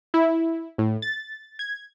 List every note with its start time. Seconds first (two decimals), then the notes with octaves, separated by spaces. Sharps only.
0.14 E4
0.78 A2
1.02 A6
1.59 G#6